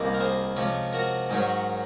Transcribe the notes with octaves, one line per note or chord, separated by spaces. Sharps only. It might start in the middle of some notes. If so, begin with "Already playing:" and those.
Already playing: C2 C3 D#3 A#3 D#4
A#4
G#4 C5
C3 F3 G#3 C#4
F#4 A#4
G#2 D#3 F#3 C#4